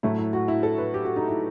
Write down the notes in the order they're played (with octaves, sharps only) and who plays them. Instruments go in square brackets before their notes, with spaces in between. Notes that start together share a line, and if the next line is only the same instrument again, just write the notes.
[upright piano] A2 F#3 A3 E4
E4
F#4
E4
A4
B4
G4
F#4
D#4
E4